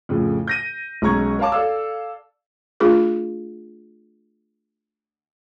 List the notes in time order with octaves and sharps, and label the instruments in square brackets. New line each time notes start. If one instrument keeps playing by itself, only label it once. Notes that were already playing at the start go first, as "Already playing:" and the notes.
[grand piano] F2 A2 C#3
G6 A#6 D#7
B1 G#3 C#4 A#5 C#6 G#6
A#4 C#5 F5 A5 D6
A4 D5 F5 E6
[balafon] A3 D4 F4 G#4 A#4